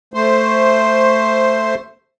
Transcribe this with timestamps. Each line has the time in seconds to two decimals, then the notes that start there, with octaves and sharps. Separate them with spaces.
0.14 A3 C5